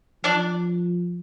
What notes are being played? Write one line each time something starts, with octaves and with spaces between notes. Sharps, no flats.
F3 D4 D5